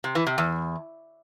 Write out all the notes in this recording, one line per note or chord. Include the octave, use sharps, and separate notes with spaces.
C3
E3
C3
E2